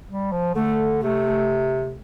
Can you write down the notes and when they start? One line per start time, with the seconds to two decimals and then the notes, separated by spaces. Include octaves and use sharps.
0.08 G3
0.32 F3
0.55 D3 A3
1.02 C3 A3